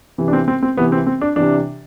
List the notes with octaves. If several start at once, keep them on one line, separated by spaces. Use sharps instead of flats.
C3 E3
D4
C4
C4
C4
C3 E3 B3
C4
C4
D4
C3 E3 D4